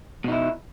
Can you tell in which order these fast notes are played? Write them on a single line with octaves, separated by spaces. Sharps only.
B2 D#4 E4